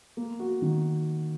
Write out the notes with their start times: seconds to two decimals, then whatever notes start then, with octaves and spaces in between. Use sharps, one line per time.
0.17 A#3
0.40 F#4
0.62 D#3